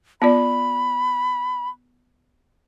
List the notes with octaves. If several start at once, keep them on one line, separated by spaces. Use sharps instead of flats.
B3 F4 D5 B5